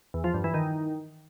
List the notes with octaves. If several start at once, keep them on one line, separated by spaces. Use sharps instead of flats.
E2
F3
G2
E3
D#3